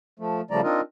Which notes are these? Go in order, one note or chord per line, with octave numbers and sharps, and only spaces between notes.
F3 A3
C#3 F3 G3 A3 D5 A#5
C4 D4 D#4 F4 A#4 D#5